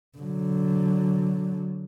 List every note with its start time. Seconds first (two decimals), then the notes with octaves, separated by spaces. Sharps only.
0.18 D3 F#3